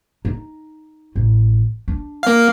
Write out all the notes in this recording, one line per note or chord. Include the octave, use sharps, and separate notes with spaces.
D#4
A1
D4
A#3 F5